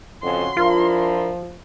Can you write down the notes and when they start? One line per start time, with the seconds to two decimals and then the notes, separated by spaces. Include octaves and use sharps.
0.23 F2 C#3 C#4 F#4 C6
0.57 F3 D4 E4 F4 A#4